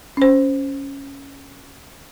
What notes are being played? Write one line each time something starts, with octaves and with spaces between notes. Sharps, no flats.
C#4 C5